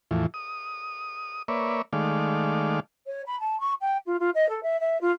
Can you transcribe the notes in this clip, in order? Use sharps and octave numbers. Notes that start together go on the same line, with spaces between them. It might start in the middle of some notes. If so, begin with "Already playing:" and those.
E2 A2 E3 F3
D#6
A#3 B4 C#5 D5 E5
D#3 G#3 A3 D5 F5
C#5
B5
A5
C#6
G5
F4
F4
D#5
A4
E5
E5
F4